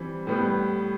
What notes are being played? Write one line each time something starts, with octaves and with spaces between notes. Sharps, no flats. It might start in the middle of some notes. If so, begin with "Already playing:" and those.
Already playing: E3 G3 C4
A2 G3 B3